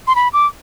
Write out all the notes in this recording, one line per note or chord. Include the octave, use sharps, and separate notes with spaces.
C6
B5
D6